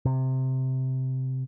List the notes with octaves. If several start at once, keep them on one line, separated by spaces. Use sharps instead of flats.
C3